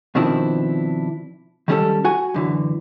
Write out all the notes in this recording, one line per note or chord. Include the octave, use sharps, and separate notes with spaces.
B2 D#3 F3 C4 D4 E4
D#3 F#3 G3 C#4 G#4 A4
F#4 G#5
F#2 D3 E3